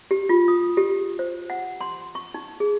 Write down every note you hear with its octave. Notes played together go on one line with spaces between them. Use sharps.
G4
F4
D#6
G4
C5
F#5
C6
C#6
D#4
G#4